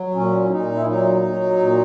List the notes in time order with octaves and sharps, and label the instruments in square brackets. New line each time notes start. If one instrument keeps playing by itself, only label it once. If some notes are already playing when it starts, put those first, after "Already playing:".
Already playing: [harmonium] F#3
A#2 C#4
E4
A#2 D#4
E4
F#3 D#4
F#3
A#2